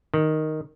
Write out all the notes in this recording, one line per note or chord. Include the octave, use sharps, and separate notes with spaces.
D#3